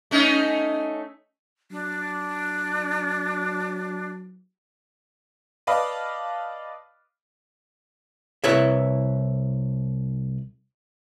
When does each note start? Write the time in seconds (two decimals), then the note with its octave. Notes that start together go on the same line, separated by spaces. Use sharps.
0.11 A3 C#4 D#4
1.71 F#3 D4
5.67 B4 D5 D#5 F5 A5 B5
8.44 C2 E4 B4 C#5 E5